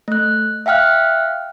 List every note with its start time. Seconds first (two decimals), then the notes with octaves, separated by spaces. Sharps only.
0.08 A3 F#6
0.66 E5 F5 G5 F6 F#6